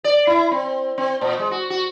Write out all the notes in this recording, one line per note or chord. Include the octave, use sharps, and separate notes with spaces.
D5
E4
C4
C4
A#2
G#3
F#4
F#4